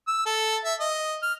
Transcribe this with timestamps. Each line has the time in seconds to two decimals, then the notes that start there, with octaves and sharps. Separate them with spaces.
0.08 E6
0.26 A4
0.65 E5
0.80 D#5
1.22 F6